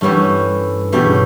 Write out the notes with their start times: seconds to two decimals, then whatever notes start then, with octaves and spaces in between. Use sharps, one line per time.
0.01 G2 E3 A3 C#4 G4
0.92 G2 B2 E3 A3 C#4 G4
1.04 C#3